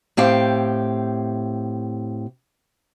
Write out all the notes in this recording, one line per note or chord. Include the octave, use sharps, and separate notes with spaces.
A2 C4 G4 F5